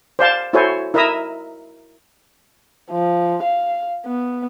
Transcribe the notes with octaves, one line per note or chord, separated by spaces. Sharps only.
C5 D5 F5 A5
E4 F#4 A4 C5 C#5 G#5
E4 A#4 D#5 E5 A#5 D#6
F3
F5
B3